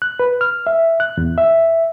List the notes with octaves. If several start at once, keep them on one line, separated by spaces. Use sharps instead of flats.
F#6
B4
F6
E5
F#6
E2
E5